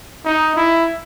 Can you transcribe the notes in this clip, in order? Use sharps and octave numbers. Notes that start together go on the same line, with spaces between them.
D#4
E4